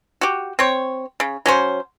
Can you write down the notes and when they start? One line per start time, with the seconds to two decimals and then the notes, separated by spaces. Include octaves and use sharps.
0.21 F#4 G4
0.59 C4 C#5
1.20 C#3
1.46 F#3 C#4 C5